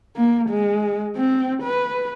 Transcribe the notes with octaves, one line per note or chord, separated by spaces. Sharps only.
A#3
G#3
C4
B4